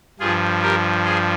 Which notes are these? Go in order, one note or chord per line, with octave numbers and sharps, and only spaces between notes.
G2 F3 F4 G#4
G4 A#4
G#4 C5